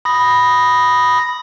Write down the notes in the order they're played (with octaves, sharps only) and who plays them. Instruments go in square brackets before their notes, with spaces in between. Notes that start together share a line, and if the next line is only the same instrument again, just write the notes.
[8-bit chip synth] B5 D#6 A#6